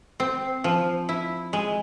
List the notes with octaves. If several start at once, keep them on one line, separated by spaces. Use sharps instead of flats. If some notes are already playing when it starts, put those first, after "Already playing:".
C4
F3
E4
G#3